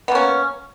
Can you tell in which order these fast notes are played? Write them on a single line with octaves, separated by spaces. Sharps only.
B3 A#3 C#4